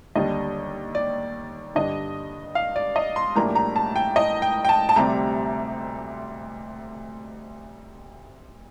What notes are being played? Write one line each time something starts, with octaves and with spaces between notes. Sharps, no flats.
D#2 D3 G3 D4 D#5
D5
G2 D3 G3 D4 D#5
F5
D5
D#5
C6
A#1 A2 G3 A#3 D4 A#5
A#5
A5
G5
D#5
G5
G5
A5
A5
D2 C3 G3 C4 A#5